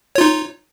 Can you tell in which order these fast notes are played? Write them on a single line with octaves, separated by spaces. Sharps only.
C#5 F4 D#4